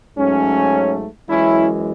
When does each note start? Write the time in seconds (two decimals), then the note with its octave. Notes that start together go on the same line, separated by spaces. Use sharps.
0.17 G#2 F#3 A3 C#4
1.29 F#2 E3 G#3 C#4 E4